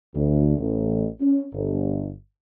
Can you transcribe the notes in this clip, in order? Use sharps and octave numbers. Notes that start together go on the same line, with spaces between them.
D2
A1
C#4
G1